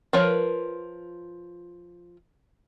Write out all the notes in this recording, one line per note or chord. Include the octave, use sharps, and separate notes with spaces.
F3 F4 A#4 B4 C#5